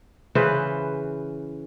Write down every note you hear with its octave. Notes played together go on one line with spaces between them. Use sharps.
C#3 E3 B4 C5